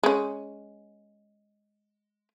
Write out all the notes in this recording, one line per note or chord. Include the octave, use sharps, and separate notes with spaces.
G#3 C#4